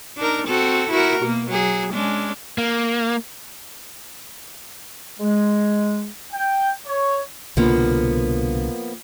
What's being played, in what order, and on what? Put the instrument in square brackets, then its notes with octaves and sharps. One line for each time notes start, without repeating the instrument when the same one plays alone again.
[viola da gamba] D4 D#4 A#4
C4 F#4 A4
E4 F#4 A#4
B2 A#3
F#3 G#4
G#3 C#4 D4
[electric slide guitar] A#3
[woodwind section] G#3
[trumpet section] G5
C#5
[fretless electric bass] C2 B2 D3 [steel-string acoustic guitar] F3 A#3 B3